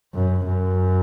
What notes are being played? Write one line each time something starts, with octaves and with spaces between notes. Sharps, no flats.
F#2
F#2